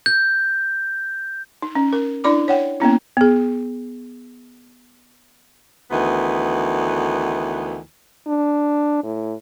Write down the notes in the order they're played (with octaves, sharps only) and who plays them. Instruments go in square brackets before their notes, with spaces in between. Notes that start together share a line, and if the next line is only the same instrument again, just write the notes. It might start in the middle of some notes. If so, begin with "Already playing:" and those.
[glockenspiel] G6
[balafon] D#4
C#4
A#4
D4 E4 D5 B5 D6
C#5 F#5 G5
A#3 B3 C#4 E4
B3 G#4
[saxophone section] D2 D#3 E3 B3
[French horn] D4
A2